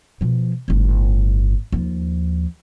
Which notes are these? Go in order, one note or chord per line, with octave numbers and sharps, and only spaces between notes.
B2 F3
G1 A2
D#2 F3